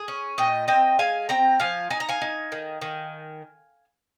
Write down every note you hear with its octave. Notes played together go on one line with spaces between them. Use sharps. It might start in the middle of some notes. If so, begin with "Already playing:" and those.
Already playing: G#4
C#4
A#2 D#5 G5
C4 D#5 G5
G#3 F5 G#5
C4 G5 A#5
F3 F5 G#5
D#4 G#5
A#5
F5 G#5
D#4
D#3
D#3